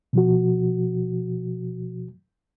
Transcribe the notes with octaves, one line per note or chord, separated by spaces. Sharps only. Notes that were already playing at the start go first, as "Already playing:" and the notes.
B2 F3 F#4